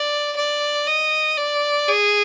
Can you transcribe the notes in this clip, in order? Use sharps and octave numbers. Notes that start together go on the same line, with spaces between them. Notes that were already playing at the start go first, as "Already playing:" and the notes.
Already playing: D5
D5
D#5
D5
G#4